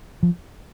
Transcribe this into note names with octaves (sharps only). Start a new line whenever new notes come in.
F3